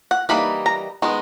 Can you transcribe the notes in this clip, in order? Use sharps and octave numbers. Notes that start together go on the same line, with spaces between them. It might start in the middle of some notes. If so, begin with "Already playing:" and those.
F#5
E3 G3 A#3 D#4 B5
A#5
D#3 G#3 B3 D#4